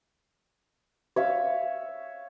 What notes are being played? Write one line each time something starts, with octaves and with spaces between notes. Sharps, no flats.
C#5 E5 F5